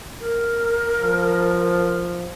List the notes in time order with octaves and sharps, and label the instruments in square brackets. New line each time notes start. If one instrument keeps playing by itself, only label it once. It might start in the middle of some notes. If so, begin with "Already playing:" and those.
[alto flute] A#4
[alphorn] F3